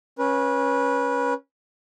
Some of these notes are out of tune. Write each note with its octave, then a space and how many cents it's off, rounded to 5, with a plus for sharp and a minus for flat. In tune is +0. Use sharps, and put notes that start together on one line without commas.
C#4 -10 B4 -25